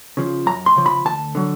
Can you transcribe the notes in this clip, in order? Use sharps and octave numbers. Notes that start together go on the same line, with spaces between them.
C#3 F3
F#2 A#5
C6
C#3 F3
B5
D2 A5
D3 F#3